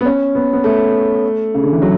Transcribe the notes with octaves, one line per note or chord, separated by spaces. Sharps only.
B3
C#4
B3
B3
A3
C#3
D3
E3
F#3